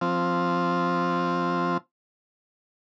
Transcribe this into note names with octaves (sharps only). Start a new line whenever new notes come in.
F3 C4